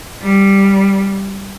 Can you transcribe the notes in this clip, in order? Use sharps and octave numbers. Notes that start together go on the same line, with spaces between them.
G3